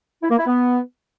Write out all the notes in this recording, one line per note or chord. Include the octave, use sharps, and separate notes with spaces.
E4
A#3
E4
B3